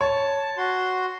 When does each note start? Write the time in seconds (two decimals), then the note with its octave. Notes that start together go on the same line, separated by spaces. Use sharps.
0.01 C#5 A5
0.58 F#4 C6